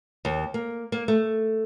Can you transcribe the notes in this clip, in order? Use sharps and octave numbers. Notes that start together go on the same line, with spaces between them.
D#2
A#3
A#3
A3